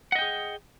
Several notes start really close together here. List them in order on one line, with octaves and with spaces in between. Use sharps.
F#5 D#5 G5 G#4